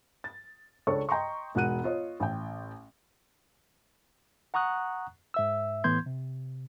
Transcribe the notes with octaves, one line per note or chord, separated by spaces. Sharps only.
A6
C#2 D4 A4 C#5 C#6
D#5 G5 A#5 C6 C#6
E1 G#2 F#4 F#5 F#6 D#7
F4 C#5 D#5
A1 G5
F#5 A#5 C#6 D#6 F#6
G#2 E5 E6
A2 E3 B3 C6 G6 G#6
C3